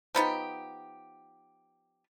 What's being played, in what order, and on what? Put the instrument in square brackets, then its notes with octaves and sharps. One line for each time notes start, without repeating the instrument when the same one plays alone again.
[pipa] F3 B3 D#4 G4